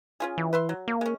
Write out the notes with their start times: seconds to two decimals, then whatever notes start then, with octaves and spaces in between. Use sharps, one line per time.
0.20 C#4 F4 G#4
0.38 E3
0.53 B4 E5 C6
0.69 F#3
0.88 A#3
1.01 G#3 C#4